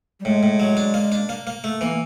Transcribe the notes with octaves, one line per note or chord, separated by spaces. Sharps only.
G3
A2 G#3
A2
F#3
D4
A#3
D4
A#3
A#3
A3
E3 A#3